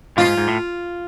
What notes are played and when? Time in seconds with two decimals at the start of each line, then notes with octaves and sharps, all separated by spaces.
0.17 G#2 B2 F4
0.27 G#2
0.37 G#2
0.48 A2